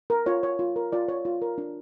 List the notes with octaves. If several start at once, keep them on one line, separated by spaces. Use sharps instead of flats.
A#4
F4 C#5
C#5
F4
A#4
F4 D5
C#5
F4
A#4
D4